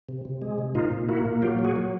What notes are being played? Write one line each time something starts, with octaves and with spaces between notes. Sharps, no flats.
C3
C3
G#3
C3
A#2 D#4 F4
A#2
A#3 E4 F#4
A#2
F#3 F4 G4
F#3
F#4 G#4
F#3